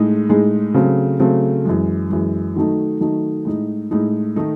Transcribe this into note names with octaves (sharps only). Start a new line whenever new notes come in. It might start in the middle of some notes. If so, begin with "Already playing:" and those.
Already playing: A2 G#3 D#4 G#4
A2 G#3 D#4 G#4
C#3 F#3 A3 C4
C#3 F#3 A3 C4
F#2 E3 G#3
F#2 E3 G#3
D#3 F#3 A3 D#4
D#3 F#3 A3 D#4
A2 G#3 D#4
A2 G#3 D#4
D#3 A3 D#4